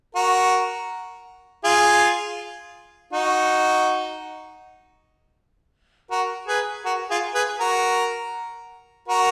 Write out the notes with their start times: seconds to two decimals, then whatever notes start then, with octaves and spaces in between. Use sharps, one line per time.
0.15 F#4 A#4
1.64 F4 G#4
3.13 D#4 F#4
6.11 F#4 A#4
6.48 G#4 B4
6.85 F#4 A#4
7.10 F4 G#4
7.34 G#4 B4
7.60 F#4 A#4
9.08 F#4 A#4